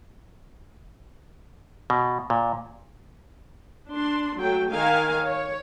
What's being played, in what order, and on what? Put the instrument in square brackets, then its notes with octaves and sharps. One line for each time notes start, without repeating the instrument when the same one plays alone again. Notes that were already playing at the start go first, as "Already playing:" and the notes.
[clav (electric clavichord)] B2
A#2
[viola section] D4 C6
F#3 A3 G5
D#3 A#4 F5 G#5
C#5